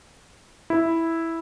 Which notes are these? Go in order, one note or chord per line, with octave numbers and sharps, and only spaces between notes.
E4